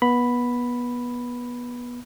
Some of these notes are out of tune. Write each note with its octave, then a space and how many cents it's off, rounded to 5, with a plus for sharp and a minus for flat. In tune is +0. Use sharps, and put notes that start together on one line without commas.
B3 -25 B5 +0